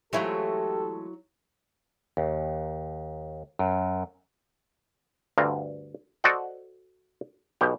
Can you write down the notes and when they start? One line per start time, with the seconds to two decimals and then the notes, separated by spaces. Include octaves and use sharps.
0.13 E3 F#3 G#3 A3 E4 F4 G4 A4
2.17 D#2
3.59 F#2
5.38 D2 G2 D3 F5 A#5
6.24 F#4 A4 C5 D5 D#5 F#5
7.61 B1 B2 G4